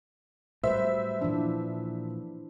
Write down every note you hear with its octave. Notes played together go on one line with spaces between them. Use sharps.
A2 F#3 G3 B4 C5 E5
A#2 E3 F3 D4